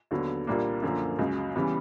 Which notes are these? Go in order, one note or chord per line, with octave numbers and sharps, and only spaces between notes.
D#2 D3 F#3 B3
C2 A#2 G3 A#3 D4
F#2 D3 F3 A#3
C#2 C#3 F#3
C#3 E3 G3 B3